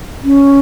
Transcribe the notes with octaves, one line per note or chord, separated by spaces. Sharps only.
C#4